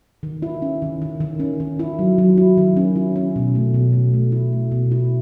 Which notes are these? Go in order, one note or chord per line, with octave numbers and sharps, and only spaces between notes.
D#3
E4
C#4
D#3
D#3
D#3
C#4
D#3
E4
F#3
F#3
E4
D#3
C#4
E4
C#4
B2
A3
B2
B2
A3
E4
A3
B2
E4